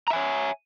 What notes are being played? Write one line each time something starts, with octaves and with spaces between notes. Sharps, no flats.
C#5 E5 G#5 A#5